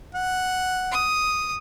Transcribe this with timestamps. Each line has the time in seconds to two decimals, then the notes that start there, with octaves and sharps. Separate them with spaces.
0.15 F#5
0.92 D#6